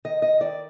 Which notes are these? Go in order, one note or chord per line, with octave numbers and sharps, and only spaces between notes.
D#3 D#5
D#5
D#3 D5